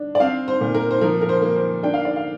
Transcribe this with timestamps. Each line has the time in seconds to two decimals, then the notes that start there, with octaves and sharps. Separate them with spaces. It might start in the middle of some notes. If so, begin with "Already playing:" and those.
Already playing: D4
0.15 D5
0.20 C4 F5
0.48 C5
0.61 A#2
0.75 A#4
0.91 C5
1.01 F3 A#4
1.21 A#4
1.29 C5
1.42 A#3
1.56 C5
1.83 D4 G5
1.94 F5
2.05 D5
2.16 F5